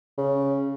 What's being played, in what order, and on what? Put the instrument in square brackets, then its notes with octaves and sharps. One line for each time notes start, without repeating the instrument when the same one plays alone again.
[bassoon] C#3